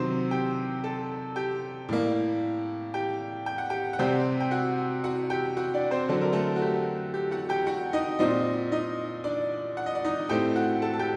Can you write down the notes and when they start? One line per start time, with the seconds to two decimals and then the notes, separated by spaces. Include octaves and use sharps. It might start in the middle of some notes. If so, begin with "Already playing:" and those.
Already playing: C3 D#3 F#3 C4 C5
0.31 G4 G5
0.84 A4 A5
1.36 G4 G5
1.89 A2 G3 A#3
2.94 G4 G5
3.46 G5
3.58 F#5
3.70 G4 G5
3.93 F#5
3.99 C3 G3 C4 G4 G5
4.40 G5
4.51 F#4 F#5
5.04 F#4 F#5
5.30 G4 G5
5.57 F#4 F#5
5.74 D4 D5
5.91 C4 C5
6.09 D3 F#3 C4 A4
6.21 A#4
6.33 A3 A4
6.56 F#4
6.62 G4
7.14 G4
7.31 F#4 F#5
7.49 G4 G5
7.67 F#4 F#5
7.93 D#4 D#5
8.19 A#2 G3 C4 D#4 D#5
8.72 D#4 D#5
9.24 D4 D5
9.77 F#5
9.86 D#5
9.95 D5
10.05 D#4 D#5
10.29 A2 A3 C4 G4 G5
10.56 F#4 F#5
10.82 A4 A5
10.94 A5
10.99 G4 G5